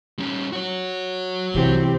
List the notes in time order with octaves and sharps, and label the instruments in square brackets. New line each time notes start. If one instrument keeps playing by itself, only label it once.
[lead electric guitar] G3 C#4
F#4 C#5
[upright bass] C2 [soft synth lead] E3 [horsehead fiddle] C4 G4